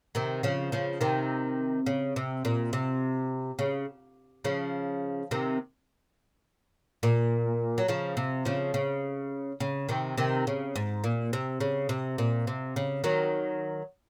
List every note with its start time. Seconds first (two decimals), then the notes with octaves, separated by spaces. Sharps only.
0.15 C3 D#3
0.43 C#3 F3
0.72 C#3 F3
1.01 C3 D#3
1.86 C#3
2.16 C3
2.45 A#2
2.73 C3
3.59 C#3
4.45 C#3 F3
5.31 C3 D#3
7.03 A#2
7.78 F#3
7.88 C#3 F3
8.17 C3
8.45 C#3 F3
8.74 C#3
9.60 C#3
9.89 C3 D#3
10.18 C3 D#3
10.47 C#3
10.76 G#2
11.04 A#2
11.33 C3
11.60 C#3
11.89 C3
12.18 A#2
12.47 C3
12.76 C#3
13.04 D#3 F#3